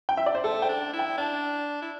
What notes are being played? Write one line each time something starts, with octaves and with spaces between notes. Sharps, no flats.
G5
E5
D5
C5
A3 A4
G5
D4
E4
G5
D4 A5
E4